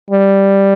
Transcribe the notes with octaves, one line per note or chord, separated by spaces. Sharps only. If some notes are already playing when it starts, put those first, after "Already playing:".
G3